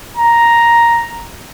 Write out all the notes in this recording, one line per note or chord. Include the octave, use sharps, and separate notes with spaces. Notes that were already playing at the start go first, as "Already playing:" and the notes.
A#5